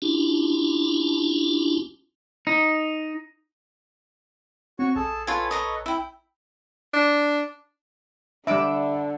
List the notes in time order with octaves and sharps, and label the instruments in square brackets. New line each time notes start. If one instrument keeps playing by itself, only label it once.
[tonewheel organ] C#4 D4 E4 F4 G4
[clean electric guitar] D#4
[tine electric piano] C4 [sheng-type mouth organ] F#4 C#5 C#6
[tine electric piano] A#1 [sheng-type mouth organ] G#4 A4 A5
[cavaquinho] F4 G#5 [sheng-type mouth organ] A4 B4 C#5
[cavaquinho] D#5 A#5 C#6
E4 G5
[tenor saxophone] D4
[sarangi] D3 [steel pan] G3 D4 [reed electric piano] E5 [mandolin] B5 D6 E6